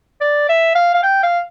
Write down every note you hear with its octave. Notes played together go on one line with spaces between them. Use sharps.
D5
E5
F5
F5
G5
F5